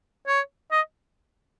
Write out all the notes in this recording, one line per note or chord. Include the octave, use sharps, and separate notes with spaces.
C#5
D#5